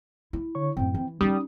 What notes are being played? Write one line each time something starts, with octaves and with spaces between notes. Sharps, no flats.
E4
D3 C#5 C#6
F#2 A2 C4 G5
E3
G3 C#4 D#4 D#6